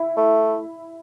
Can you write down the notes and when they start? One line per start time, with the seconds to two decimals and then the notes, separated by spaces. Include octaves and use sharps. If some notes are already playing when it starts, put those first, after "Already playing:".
Already playing: E4
0.17 A3